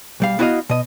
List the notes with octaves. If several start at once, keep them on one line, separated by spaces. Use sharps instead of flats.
B1 G3 F5
B3 E4 F#4 C5 D#5 F5
B2 D#5